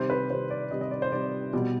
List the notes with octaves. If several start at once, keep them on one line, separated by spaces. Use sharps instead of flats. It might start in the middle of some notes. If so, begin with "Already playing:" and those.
Already playing: C3 D#3 G3 C5
B4
C3 D#3 G3 C5
D5
C3 D#3 G3 D#5
D#5
D5
C5
C3 D#3 G3 D5
B2 G3